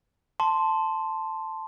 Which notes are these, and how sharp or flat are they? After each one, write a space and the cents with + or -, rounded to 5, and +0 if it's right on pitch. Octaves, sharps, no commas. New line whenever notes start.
A5 +0 C6 +0